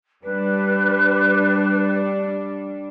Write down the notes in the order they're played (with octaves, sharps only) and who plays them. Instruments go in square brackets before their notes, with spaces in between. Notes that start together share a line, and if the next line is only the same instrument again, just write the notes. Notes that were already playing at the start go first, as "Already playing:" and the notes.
[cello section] G3 D4 [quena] B4